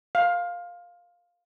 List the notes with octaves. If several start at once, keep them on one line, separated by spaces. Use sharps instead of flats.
F5